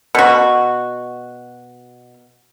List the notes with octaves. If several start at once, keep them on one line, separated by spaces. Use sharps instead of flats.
B2 F#4